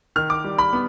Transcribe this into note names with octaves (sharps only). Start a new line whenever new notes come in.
D#3 F6
D6
G3
B5
B3